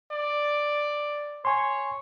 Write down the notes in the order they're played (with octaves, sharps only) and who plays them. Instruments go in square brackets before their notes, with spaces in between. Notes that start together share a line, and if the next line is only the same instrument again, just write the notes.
[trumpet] D5
[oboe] C#5 [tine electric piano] G#5 C6